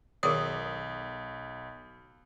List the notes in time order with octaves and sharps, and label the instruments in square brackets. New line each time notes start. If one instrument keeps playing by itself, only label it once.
[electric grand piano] B1 [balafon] D#3 C#5 D5 [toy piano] G#4 A#4 D#6